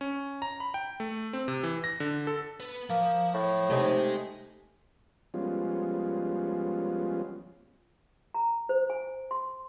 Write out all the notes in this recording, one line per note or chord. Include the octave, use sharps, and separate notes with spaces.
C#4
A#5
B5
G5
A3
C4
C3
E3
A#6
D3
A4
B3 B4
F3 A#3
A2
C3 G#3 A3 D#4 G#5
F3 G3 G#3 B3 C#4 F4
A#5
C5
G#5
C6